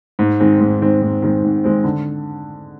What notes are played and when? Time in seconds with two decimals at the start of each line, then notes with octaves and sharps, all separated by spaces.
0.19 G#2
0.40 D#3 G#3 C4
0.60 G#2
0.81 D#3 G#3 C4
1.02 G#2
1.22 D#3 G#3 C4
1.44 G#2
1.64 D#3 G#3 C4
1.84 D3